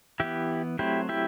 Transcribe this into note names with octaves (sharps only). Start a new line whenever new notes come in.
E3 B3 E4 G4
F#3 A3 C4 E4 G4
E4 G4